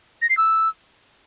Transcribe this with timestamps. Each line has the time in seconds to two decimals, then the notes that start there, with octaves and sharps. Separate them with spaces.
0.22 A#6
0.30 C7
0.37 E6